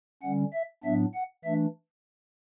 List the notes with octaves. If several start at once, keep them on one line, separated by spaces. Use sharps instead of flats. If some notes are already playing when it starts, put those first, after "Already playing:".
D3 G3 C#4 F#5
E5
A2 F#3 B3 D4 E5
F#5
E3 A3 D4 E5